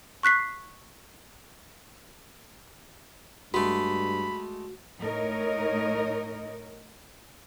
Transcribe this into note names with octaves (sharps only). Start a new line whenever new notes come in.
C#6 F#6 B6 C7
G2 G#3 A3 F#4 B5
A2 D#4 A#4 C#5 D#5